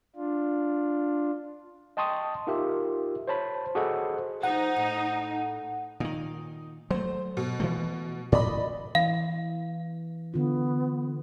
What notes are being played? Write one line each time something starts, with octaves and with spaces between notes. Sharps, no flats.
D4 F4
D#5 G5 A5 C6 C#6 D#6
D#4 F4 G4 A#4 E5
C5 C#5 A5 B5
F#4 G#4 A4 C5 D#5 F#5
F3 D#4 F#5
A2
A#2 D#3 D#4
F#3 A3 C5
B2
E3 F3 A3
A2 D5 D#5 B5
E3 F5
D3 B3 F4